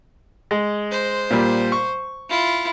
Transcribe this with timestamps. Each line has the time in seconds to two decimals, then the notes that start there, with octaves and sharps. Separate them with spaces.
0.51 G#3
0.91 C5
1.30 A#2 G3
1.72 C#6
2.29 E4 F4